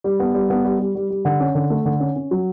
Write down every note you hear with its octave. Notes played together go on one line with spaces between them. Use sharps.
G3
B3
G3
B3
G3
G3
G3
G3
D3
C#4
D3
A3
D3
C#4
C#4
F#3